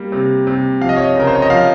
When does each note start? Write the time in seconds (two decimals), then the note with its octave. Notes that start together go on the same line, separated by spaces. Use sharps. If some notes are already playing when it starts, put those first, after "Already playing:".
Already playing: G3 A#3
0.12 C3
0.47 C3
0.81 F3 F5
0.89 D#5
0.96 C#5
1.03 D#5
1.16 C#3 A#4
1.27 C5
1.35 C#5
1.42 D#5
1.50 F3 F5